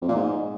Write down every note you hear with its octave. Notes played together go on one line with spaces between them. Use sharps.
F2
A#2
G#2